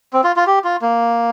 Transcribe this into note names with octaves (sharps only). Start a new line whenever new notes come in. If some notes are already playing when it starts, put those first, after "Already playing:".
C4
F4
F4
G4
F4
A#3